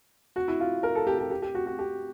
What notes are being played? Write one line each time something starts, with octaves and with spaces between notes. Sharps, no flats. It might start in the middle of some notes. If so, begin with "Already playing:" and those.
F#4
E4
F4
A#4
A4
G4
G4
G4
G4
F#4
F#4
G4